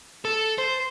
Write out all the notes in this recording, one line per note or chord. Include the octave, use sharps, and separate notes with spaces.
A4
C5